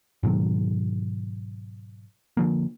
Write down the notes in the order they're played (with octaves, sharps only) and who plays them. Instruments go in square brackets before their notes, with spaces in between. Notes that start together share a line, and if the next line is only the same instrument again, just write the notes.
[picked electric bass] G#2 B2 D#3 F#3
D3 F3 A#3